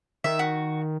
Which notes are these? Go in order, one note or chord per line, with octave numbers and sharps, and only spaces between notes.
D#3 E5
F#4